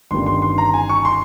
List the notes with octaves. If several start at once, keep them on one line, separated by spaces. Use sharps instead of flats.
G1 G2 D#3 G3 C#4 C6
C6
C6
A#5
G#5
C#6
C6